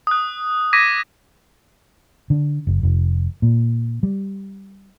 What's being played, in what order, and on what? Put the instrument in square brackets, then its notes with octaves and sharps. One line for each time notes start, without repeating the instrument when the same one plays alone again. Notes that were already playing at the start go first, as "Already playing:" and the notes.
[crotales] D#6 F#6
D6 G#6 A#6 B6 D#7
[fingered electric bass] D3
F#1
F1
A#2
G3